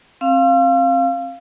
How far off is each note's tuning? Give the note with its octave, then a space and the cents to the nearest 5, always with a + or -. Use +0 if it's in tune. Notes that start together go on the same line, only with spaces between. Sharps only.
C4 +30 F5 +0 E6 +45